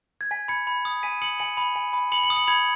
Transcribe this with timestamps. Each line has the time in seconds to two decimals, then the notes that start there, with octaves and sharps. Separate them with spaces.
0.21 G#6
0.31 G#5 B6
0.48 B5 G#6 C#7
0.67 B5
0.85 D#6
1.03 G#5 B6 D#7
1.22 D#6 C#7 F#7
1.39 G#5 C#7 F#7
1.57 B5
1.76 G#5
1.93 B5
2.12 B5 C#7 F#7
2.23 C#7 F#7
2.30 D#6
2.37 C#7 F#7
2.48 B5 G#6 C#7